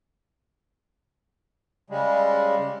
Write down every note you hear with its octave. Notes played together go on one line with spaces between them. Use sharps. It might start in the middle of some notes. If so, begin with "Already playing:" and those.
C#3 G3 G#3